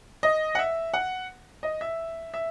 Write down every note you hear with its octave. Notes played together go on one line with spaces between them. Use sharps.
D#5
F#5
E5
F#5
D#5
E5
E5